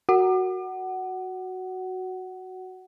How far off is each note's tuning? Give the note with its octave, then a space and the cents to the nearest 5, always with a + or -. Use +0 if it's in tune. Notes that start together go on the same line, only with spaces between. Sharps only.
F#4 +0 F#5 +20